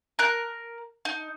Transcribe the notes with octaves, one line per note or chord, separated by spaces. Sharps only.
A#4 F#6
D#4